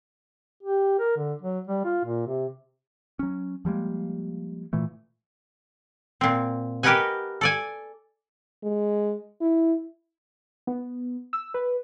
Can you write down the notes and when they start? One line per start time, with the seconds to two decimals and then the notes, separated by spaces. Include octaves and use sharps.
0.63 G4
0.99 A#4
1.16 D3
1.42 F#3
1.67 G3
1.84 F4
2.05 A#2
2.27 C3
3.19 F#3 C#4
3.65 F3 G3 G#3 A#3
4.73 A#2 E3 A3
6.21 A#2 C4
6.83 G4 A#4 B4 D#5 F#5 G#5
7.41 A4 D5 G#5
8.63 G#3
9.41 E4
10.67 B3
11.33 E6
11.54 B4